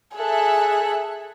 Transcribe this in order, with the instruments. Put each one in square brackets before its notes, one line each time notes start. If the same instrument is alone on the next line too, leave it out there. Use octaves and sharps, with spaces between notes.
[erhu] G#4 [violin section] A4 E5 F#6